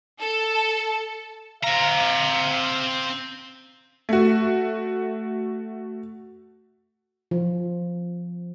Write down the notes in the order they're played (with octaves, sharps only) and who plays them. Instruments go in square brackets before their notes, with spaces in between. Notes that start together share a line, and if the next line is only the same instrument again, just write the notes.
[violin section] A4
[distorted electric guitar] C4 A#5 [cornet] F5
[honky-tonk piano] A3 F#4
[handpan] F3